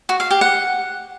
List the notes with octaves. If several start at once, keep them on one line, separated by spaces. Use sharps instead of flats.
F#4
F5
G4
F#5